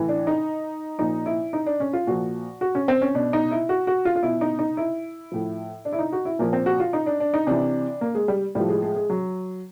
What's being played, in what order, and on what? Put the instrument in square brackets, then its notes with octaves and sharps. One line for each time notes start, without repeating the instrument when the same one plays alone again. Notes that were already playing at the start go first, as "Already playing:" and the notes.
Already playing: [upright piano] A2 E3
D4
D#4
A#2 F3 D#4
E4
D#4
D4
C#4
F4
A#2 F3 F#4
F#4
C#4
C4
C#4
B2 D4
D#4
E4
F#4
F#4
F4
F4
B2 E4
D#4
D#4
E4
A2 F3
D4
E4
D#4
F#4
E4
A#2 F3 A#3
C4
F#4
F4
D#4
D4
D4
D#4
C3 E3 D4
A#3
G#3
G3
A2 F3 G3
G#3
G#3
G#3
F#3